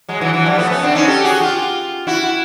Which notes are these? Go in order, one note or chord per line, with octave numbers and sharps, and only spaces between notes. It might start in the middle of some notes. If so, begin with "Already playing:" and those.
F#3 G#3
E3 F#3
E3 F#3
F3 G3
A3 B3
B3 C#4
C4 D4
C#4 D#4
G4 A4
F#4 G#4
F4 G4
E4 F#4